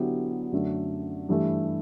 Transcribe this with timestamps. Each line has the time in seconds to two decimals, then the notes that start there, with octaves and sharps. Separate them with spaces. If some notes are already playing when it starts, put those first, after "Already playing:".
Already playing: D3 F#3 B3 E4 G4
0.52 F#2 D3 A3
1.29 G2 E3 A3